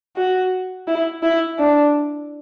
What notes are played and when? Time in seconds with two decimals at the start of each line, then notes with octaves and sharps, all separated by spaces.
0.16 F#4
0.87 E4
1.23 E4
1.58 D4